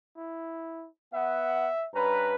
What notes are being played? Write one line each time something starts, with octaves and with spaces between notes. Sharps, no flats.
E4
B3 E5 F#5
G2 C#4 B4 A#5